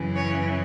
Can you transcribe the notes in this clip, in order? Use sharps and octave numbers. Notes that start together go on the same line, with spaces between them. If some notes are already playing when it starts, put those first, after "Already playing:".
Already playing: F#2 C#3 E3
C#5